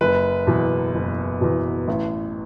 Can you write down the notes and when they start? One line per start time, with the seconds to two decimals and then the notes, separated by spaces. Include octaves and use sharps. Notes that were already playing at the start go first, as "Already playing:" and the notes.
0.01 F#1 B4
0.47 E2 B2 F#3
0.94 F#1
1.41 E2 B2 F#3
1.88 A1